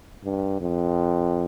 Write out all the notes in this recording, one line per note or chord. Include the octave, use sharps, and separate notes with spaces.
G2
F2